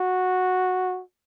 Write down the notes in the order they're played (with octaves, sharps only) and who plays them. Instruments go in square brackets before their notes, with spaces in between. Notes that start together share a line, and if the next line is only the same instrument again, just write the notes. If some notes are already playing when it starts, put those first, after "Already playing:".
Already playing: [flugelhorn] F#4